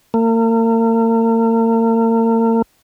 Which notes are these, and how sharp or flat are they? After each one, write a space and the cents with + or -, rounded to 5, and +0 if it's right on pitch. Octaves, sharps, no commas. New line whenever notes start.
A#3 -40